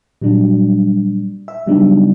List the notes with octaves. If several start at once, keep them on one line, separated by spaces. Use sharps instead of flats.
A#2 F#3 G3 D4
E5
C#3 F#3 G3 B3 D4 D#4